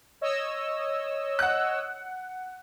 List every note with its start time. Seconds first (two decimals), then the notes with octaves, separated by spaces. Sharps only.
0.21 C#5 D#5 E6
1.39 F#5 F#6